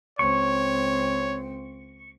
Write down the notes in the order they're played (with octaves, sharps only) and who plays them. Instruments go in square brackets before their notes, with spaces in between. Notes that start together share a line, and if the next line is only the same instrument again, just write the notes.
[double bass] C#2 C4 [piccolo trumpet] C#5 [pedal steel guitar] C#6